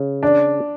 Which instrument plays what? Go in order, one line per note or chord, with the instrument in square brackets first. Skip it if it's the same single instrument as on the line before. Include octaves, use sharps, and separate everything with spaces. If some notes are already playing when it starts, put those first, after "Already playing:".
Already playing: [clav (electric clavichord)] C#3
[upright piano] D4